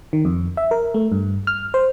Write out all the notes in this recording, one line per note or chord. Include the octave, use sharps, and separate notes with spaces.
D#3
F2
E5
A#4
A3
G2
F6
C5